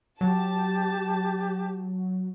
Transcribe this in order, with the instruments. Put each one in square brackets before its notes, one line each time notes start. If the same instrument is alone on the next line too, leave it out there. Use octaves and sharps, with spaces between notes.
[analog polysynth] F#3 [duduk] G4 [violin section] A5